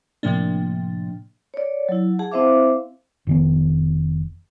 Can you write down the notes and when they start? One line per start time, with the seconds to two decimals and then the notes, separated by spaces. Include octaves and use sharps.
0.23 A2 C3 F3 A#3 D4
1.54 C#5 D5
1.89 F#3 E4
2.19 G#4 F#5 A5
2.32 C4 E4 C5 E5 F5 D6
3.27 F1 D#3 B3